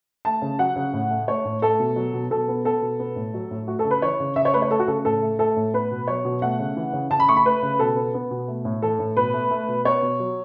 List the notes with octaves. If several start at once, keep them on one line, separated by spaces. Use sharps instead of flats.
A3 A5
C#3
F#3 F#5
C#3
A2
A3
A3 C#5
A2
A3 A4
B2
F#3
B2
B2 A4
B3
B3 A4
B2
B3
A2
F#3
A2
A3 F#4
A4
C#3
B4
E3 C#5
C#3
C#3 E5
C#5
A3 B4
C#5
A3 A4
F#4
C#3 A4
A2 A4
A3
A3 A4
A2
B3 B4
B2
F#3 C#5
B2
A3 F#5
C#3
E3
C#3
C#3 A5
B5
A3 C#6
B5
A3 B4
C#3
B2 A4
B3
B3
B2
A3
A2
E3 A4
A2
B2 B4
A3
A3
B2
B3 C#5
B2
F#3